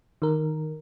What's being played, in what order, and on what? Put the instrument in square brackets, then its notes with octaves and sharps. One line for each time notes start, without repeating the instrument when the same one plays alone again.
[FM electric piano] D#3 A#4